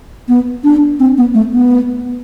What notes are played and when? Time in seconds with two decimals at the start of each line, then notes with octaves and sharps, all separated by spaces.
0.29 B3
0.64 D4
0.99 C4
1.18 B3
1.34 A3
1.52 B3